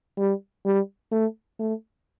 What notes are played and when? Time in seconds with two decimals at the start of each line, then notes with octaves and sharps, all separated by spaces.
0.18 G3
0.65 G3
1.11 A3
1.59 A3